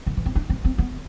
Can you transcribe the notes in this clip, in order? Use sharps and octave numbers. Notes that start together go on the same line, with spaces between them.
D3
E3
C4
D4
C4
C4
B3